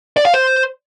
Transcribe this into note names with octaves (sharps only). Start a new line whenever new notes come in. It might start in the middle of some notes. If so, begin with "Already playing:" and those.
D5
F5
C5